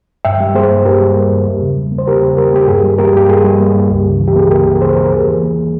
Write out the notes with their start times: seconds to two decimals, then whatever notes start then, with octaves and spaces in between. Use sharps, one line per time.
0.25 G2 E5 G5
0.40 G3
0.55 A#3 G#4 C5
0.70 G2
0.85 G2 G4 A#4
1.01 G3
1.16 A#3
1.31 G2
1.46 E2
1.62 C#3
1.77 G3
1.92 A#3
1.98 C5
2.07 E2 G4 A#4
2.23 C#3
2.37 G3 G4 A#4
2.53 A#3 G4
2.68 G2 G#4
2.84 G3
2.98 A#3 G4 A#4
3.14 G2 G4
3.29 G2 G#4
3.44 G3
3.60 A#3
3.74 G2
3.90 C#2
4.05 C#3
4.20 E3
4.27 G4
4.36 A#3 G#4
4.50 C#2 G4 A#4
4.66 C#3
4.75 A#4
4.81 E3 G#4 C5
4.96 A#3 C5
5.04 A#4
5.11 E2 G#4
5.27 E3
5.42 A#3